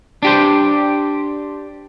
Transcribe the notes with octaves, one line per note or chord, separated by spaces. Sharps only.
D4 G4 C5